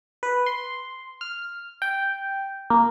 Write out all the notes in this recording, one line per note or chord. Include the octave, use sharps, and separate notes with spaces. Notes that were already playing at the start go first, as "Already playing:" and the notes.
B4
C6
F6
G5
A#3